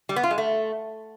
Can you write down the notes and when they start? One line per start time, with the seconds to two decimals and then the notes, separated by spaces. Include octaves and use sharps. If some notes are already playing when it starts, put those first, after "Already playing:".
0.09 G3
0.16 B3
0.23 F4
0.31 G#3
0.38 A3